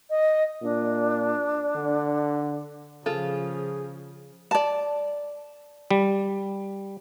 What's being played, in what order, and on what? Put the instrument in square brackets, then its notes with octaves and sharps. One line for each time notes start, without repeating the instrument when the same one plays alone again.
[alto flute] D#5
[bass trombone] A#2 [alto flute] D4
[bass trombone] D3
[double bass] C#3 F3 [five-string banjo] F4 A4 [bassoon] G#4
[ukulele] D5 A5
[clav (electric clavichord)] G3